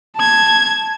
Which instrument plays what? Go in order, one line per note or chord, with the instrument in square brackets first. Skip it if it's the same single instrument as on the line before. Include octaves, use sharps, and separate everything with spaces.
[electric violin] A5 G#6